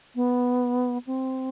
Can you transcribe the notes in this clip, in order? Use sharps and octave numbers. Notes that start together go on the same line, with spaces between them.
B3
C4